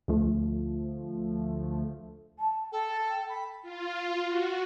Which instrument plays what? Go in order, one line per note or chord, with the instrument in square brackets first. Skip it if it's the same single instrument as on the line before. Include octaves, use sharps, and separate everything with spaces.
[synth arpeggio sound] D2 F3 A3
[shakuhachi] A5
[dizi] A4 [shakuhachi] G5
[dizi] B5
[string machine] F4
F#4